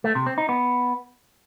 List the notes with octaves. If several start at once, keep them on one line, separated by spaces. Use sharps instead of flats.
A3
C3
C4
D#4
B3